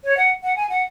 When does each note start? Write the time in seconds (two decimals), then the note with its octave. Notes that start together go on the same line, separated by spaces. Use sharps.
0.04 C#5
0.17 F#5
0.43 F#5
0.56 G#5
0.69 F#5